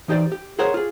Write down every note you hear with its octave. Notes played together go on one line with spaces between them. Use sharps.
E3 D#4 G4 C5 D5
G4
G#4 A#4 C5 C#5 F#5
F4 G#4